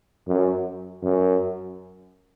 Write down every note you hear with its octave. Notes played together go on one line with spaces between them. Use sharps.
F#2
F#2